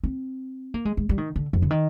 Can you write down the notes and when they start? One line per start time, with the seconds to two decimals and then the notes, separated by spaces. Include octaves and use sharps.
0.04 C4
0.74 A#3
0.85 G#3
0.97 G#3
1.09 G3
1.18 D#3
1.36 D3
1.53 F2
1.62 D3
1.71 D#3